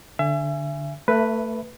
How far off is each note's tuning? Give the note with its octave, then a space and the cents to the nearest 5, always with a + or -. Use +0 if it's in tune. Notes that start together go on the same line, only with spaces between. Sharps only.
D3 +0 E5 +35 G#5 +0
A3 +25 B4 +0 E5 +0